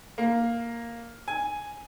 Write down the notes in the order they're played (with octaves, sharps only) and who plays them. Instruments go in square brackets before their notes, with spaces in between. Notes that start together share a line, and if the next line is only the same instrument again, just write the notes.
[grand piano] A#3
G#5